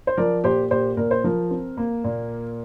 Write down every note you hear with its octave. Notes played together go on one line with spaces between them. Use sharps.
C5
F3 A#4 D5
A#2 G4 C5
A#2 G4 C5
A#2 A#4
C5
F3 A#4
C4
A#3
A#2